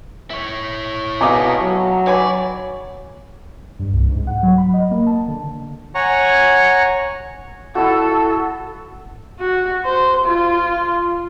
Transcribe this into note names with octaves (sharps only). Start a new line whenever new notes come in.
E4 C#5
B2 A3 D#5 F5 G#5 A#5 D6
F#3
C#5 D5 G#5 B5
G2
C2
G#2
F#5
F#3
B5
D#5
A#3
A5
D3
C#5 F#5 G#5 A#5 C#6
E4 F#4 A4
F#4
C5
F4